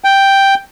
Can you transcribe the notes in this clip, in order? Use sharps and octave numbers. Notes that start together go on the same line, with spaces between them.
G5